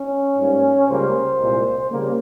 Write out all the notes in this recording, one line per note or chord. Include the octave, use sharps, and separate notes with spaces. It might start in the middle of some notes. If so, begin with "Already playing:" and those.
Already playing: C#4
G#2 G3 A#3
C#2 C#3 G3 A#3 C5
C2 A#2 G#3
C#3 G3 A#3